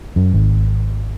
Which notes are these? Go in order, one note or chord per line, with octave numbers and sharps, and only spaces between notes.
F#2
G#1